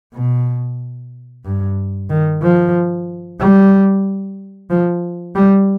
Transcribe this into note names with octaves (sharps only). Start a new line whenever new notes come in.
B2
G2
D#3
F3
G3
F3
G3